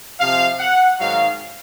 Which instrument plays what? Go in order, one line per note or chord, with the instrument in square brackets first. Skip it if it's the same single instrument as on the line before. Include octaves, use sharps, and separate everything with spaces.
[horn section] C3 F3 F5
F#5
G#2 D#3 F#3 F5